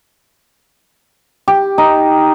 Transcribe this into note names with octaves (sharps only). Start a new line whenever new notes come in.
G4
D#4